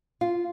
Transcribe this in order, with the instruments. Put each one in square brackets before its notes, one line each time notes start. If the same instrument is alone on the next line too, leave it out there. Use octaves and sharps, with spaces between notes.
[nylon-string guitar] F4